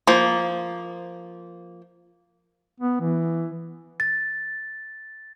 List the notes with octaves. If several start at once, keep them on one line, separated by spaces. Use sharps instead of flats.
F3 A#3
B3
E3
A6